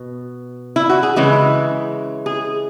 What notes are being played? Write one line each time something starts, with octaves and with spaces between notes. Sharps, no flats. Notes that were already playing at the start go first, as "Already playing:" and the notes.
Already playing: B2
E4
F#4
G#4
C#3 E3 G#3 E4
G#4